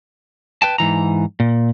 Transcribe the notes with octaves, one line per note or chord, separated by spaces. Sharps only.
B4 G5 A5
G#2 E3 A#5
A#2